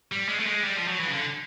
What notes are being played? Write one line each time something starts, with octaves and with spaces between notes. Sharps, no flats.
G3
G#3
A3
G#3
G3
F3
F#3
E3
C#3
D3